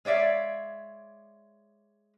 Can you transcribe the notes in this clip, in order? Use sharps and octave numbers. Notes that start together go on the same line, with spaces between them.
G#3 C#5 D5 E5 F5